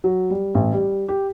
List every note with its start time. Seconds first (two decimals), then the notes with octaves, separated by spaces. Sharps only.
0.04 F#3
0.30 G3
0.55 A1
0.73 G3
1.08 G4